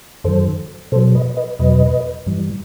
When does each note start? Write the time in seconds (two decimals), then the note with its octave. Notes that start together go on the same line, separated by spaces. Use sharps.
0.24 F#2 D#3 F#3 A4 C5
0.92 B2 A4 C5
0.96 F#3
1.15 B4 D#5
1.37 B4 D#5
1.59 E2 B2 F#3 B4 D#5
2.26 G2 E3 G3